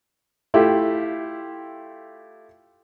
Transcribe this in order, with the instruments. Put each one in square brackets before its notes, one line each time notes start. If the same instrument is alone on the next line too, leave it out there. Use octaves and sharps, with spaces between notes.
[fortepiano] A3 E4 F4 G4